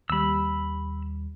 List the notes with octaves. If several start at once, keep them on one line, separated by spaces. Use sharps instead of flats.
D#2 G3 B5 E6